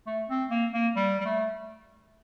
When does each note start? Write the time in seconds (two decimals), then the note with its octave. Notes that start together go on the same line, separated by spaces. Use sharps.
0.07 A3
0.29 C4
0.51 A#3
0.73 A#3
0.96 G3
1.20 G3
1.25 A3